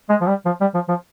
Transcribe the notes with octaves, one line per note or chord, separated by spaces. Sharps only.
G#3
F3
G3
F3
G3
F3
F3